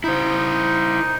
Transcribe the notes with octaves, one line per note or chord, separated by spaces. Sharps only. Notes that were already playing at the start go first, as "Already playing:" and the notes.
D#4 E4 C5